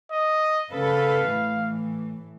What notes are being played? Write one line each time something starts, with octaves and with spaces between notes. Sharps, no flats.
D#5
C#3 A4 B4 F5
A2 E3